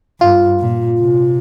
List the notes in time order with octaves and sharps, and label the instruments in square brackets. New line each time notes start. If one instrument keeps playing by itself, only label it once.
[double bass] G2 [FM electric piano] F4
[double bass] A#2
C3